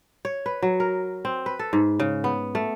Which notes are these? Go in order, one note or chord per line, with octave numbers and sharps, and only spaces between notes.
C#5
B4
F#3
A#4
C4
B4
A4
G#2
C#3
B3
A3